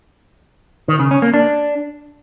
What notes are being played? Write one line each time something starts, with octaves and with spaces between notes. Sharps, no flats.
D#3
C#3
C#4
A#3
D4